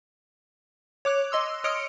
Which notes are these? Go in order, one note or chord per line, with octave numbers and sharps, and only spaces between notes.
C#5 D6 F#6
D#5 C6 E6
C#5 D#5 D#6 F6 C#7 D7